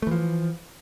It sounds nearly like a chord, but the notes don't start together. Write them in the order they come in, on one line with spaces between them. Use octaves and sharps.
A3 E3 F3